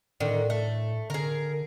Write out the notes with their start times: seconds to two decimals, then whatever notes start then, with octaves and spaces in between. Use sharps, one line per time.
0.20 A2 D3 D#3
0.50 A3
1.10 D3 G#4 A#4